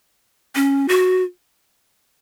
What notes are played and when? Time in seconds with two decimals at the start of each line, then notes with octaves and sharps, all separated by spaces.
0.55 C#4
0.88 F#4